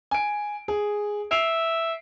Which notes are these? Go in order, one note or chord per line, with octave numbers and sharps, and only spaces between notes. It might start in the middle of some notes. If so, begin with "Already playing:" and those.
G#5 D7
G#4
E5 C7 D7 F7